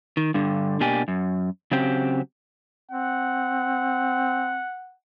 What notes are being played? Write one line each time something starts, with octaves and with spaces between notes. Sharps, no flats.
D#3
G2 D3
B2 A#3 D4 G4 G#5
F#2
C#3 F#3 C4 G4
C4 F#5